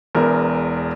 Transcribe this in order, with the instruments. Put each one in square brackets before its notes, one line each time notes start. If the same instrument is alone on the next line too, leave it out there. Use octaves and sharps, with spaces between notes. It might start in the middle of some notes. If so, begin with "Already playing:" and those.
[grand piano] E1 E2 A#4